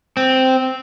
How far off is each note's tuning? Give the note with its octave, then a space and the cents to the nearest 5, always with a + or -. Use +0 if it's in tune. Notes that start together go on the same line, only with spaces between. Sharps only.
C4 -5